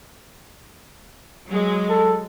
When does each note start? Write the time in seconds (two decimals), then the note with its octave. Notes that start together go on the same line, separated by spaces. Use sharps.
1.47 F#3 G#3
1.89 A4